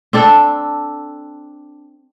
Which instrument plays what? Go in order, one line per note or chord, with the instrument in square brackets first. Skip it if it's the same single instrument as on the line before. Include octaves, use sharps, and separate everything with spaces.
[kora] C4 D4 A4